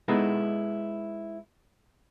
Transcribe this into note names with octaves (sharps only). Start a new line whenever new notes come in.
G#3 B3 D#4 E4 A4